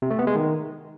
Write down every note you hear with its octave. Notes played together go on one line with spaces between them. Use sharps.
C3
A3
B3
G#3
D#3